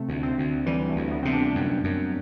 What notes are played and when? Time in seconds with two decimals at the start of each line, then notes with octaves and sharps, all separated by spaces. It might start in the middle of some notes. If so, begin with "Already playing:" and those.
Already playing: C3 A3
0.09 D2
0.23 C4
0.38 D2
0.66 E3 G3
0.90 A3
0.96 D2
1.11 B3
1.23 C3 C4
1.33 D4
1.55 F#2
1.84 F#2